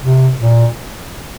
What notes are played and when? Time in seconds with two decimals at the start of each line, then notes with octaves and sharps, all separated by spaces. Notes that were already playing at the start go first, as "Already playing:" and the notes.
0.03 C3
0.41 A#2